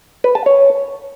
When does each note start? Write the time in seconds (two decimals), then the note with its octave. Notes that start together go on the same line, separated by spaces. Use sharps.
0.24 B4
0.35 A5
0.46 C#5